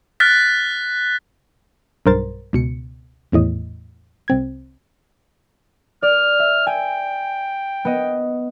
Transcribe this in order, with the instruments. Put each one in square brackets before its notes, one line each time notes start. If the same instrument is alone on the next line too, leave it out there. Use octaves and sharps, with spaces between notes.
[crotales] F6 F#6 A6 B6
[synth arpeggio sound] B1 G2 A#4 C5 A6
C#2 B2 C#7
G#1 E2 A2 D#5
C2 C4 G#6
[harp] D5 [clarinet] F6
[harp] E5
[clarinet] G5 [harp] G#5
[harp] B3 D#5